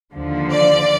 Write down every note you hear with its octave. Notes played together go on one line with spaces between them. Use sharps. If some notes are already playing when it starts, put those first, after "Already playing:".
D#2 D3 F3
D5